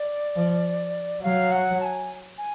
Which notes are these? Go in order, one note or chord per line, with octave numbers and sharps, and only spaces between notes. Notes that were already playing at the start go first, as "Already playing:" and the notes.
Already playing: D5
F3
F#3 F5
F#5
A5
G#5
G#5